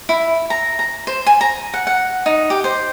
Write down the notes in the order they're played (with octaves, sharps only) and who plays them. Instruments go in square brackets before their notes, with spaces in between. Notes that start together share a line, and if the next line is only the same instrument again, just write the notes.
[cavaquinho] E4
A#5
A#5
C5
G#5
A#5
F#5
F#5
D#4
G4
C5